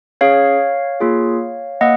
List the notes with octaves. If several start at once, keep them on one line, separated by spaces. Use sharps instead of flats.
C#4 G#4 C#5 F5
A#3 F4 G#4
A#3 D#5 F#5